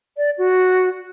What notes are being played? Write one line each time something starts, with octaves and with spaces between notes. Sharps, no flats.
D5
F#4